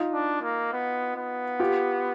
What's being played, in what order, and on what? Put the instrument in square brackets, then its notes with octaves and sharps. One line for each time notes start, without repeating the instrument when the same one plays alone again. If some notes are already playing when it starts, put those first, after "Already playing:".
Already playing: [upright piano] D#4 F4
[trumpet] D4
A#3
B3
B3
[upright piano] F4 G4